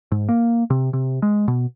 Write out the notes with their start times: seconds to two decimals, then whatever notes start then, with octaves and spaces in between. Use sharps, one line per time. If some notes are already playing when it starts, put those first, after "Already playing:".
0.12 G#2
0.29 A#3
0.70 C3
0.93 C3
1.22 G#3
1.48 B2